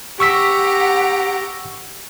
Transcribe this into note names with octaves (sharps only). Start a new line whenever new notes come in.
G4 F#5 A#5 C#6 E6 B6